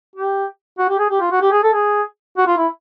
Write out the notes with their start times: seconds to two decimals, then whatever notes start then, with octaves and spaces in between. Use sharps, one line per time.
0.16 G4
0.79 F#4
0.89 G4
0.99 G#4
1.10 G4
1.21 F4
1.32 F#4
1.41 G4
1.52 G#4
1.64 A4
1.74 G#4
2.38 F#4
2.47 F4
2.58 E4